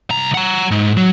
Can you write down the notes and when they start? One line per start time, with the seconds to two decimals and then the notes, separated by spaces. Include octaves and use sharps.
0.10 C2 A#5
0.34 F#5 A#5
0.71 G#2
0.97 F#3